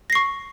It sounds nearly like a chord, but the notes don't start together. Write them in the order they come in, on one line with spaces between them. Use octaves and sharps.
A#6 C7 C#6